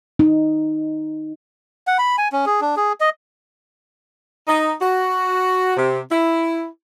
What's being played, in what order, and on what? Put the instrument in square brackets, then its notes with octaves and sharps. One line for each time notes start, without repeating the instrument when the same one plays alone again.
[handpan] D#4
[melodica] F#5
B5
G#5
C#4
G#4
D4
G#4
D#5
[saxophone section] D#4
F#4
C3
E4